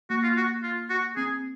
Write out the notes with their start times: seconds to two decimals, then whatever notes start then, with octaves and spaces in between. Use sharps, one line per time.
0.10 A#3 F#4
0.23 F4
0.37 F#4
0.63 F4
0.90 F#4
1.16 C4 G#4